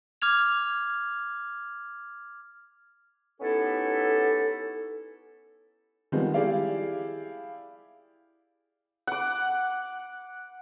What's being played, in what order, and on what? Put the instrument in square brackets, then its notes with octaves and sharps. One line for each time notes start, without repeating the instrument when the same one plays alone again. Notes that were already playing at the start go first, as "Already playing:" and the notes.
[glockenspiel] D6 F6 G#6 F7
[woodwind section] B3 C#4 D#4 E4 G4 A4
[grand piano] D#3 F3 G3 G#3 B3 C4
E4 G4 G#4 D5 F5
[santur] F#5 D6